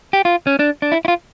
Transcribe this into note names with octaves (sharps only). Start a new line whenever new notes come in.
G4
F4
C#4
D4
D4
E4
E4
F4